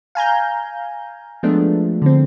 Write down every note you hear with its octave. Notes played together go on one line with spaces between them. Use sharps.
F5 G#5 A#5 G6
F3 G#3 A3 B3 D4
D3 C4